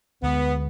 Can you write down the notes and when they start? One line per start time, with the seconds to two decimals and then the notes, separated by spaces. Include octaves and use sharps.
0.22 D2 D3 G#3 B3